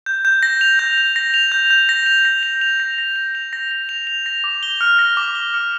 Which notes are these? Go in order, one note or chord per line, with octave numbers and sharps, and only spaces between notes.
G6
G6
A#6
F7
G6
G6
A#6
F7
G6
G6
A#6
F7
A#6
F7
F7
A#6
A#6
F7
F7
A#6
A#6
F7
F7
A#6
D6
G7
F6
A#6
D6
G7
F6